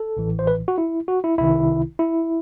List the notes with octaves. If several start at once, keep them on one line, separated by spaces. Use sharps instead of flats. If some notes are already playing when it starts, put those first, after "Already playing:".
Already playing: A4
A1 A2 E3
C5
B4
F#4
E4
F#4
E4
C2 C3 D#3 E4
E4